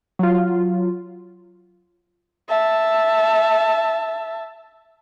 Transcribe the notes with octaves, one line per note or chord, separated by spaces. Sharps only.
F#3 F4
E5 A5